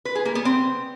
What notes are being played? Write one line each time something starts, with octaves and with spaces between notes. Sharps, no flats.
B4
G#4
A#3
B3
C4